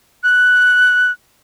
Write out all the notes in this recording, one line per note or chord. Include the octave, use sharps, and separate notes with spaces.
F#6